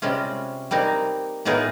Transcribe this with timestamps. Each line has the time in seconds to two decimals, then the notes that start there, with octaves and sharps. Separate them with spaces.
0.02 C3 G3 G#3 C#4 F4
0.71 G3 A#3 C4 D#4
1.45 A2 B3 D#4 F4 G#4 A#4